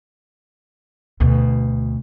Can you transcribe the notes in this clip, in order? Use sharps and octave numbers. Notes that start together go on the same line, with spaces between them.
D2 B2